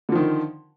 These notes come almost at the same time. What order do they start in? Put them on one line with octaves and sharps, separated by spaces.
D3 F3 D#3